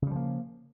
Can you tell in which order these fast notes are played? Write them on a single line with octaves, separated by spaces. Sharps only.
C#3 G3 F3 A#3